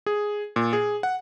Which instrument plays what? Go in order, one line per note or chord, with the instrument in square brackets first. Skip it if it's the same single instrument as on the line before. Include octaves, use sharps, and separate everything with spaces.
[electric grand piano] G#4
A#2
G#4
F#5